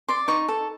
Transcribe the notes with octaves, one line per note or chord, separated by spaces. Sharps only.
D5 C6
D#4 C#6
A4